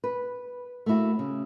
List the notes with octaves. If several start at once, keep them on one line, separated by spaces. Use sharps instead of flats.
B4
A3 A#3 D4 E4 F#4
C#3